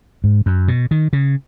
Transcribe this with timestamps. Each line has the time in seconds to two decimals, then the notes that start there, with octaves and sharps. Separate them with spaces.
0.24 G#2
0.46 F#2
0.68 B2
0.91 D#3
1.13 C#3